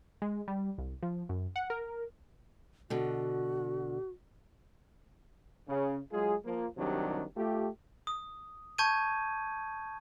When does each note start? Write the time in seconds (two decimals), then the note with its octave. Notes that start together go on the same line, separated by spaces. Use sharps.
0.22 G#3
0.48 G3
0.78 C2
1.03 F3
1.29 F#2
1.56 F#5
1.70 A#4
2.90 B2 D3 F#4
5.68 C#3
6.12 F#3 G#3 F4 G#4
6.45 F3 A#3 F4
6.77 C2 C3 D#3 F#3 D4 G4
7.36 A3 F4 G4
8.07 D#6
8.78 A5 C#6 G6 G#6 D#7